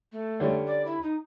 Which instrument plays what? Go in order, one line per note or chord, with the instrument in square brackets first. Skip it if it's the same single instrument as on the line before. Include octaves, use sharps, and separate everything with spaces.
[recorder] A3
[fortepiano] D3 G3 C#4
[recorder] D5
E4
D#4